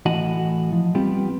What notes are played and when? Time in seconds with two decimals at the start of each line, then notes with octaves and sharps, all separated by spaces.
0.06 A2 E3 F#4 D#5 F#5 A5
0.73 F3
0.95 G3 B3 C4 F4 G4